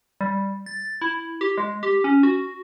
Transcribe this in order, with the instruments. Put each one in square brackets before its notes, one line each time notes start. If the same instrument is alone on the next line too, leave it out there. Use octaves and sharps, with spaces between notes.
[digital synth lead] G3
A6
E4
G4
G#3
G4
C#4
F#4